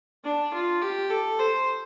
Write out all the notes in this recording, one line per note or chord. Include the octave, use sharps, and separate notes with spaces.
D4
F4
G4
A4
C5